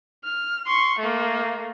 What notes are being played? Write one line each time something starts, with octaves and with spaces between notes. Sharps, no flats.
F6
C6 C#6
A3 A#3